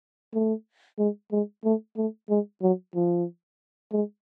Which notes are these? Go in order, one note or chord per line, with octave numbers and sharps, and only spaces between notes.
A3
G#3
G#3
A3
A3
G#3
F#3
F3
G#3